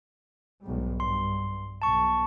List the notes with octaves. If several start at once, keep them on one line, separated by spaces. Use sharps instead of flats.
B1 G#2 G3
G2 C6
B1 A5 C#6